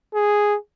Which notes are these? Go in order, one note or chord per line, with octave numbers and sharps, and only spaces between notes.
G#4